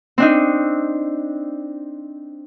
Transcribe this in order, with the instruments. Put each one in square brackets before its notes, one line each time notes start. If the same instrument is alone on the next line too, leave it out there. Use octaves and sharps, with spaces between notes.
[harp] C4 D4 D#4